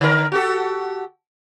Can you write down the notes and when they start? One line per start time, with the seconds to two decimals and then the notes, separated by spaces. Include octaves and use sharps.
0.01 D3 A#4
0.32 F#4 G4 A4